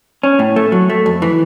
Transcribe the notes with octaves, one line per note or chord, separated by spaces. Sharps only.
C#4
A2
A3
F#3
A3
F2
E3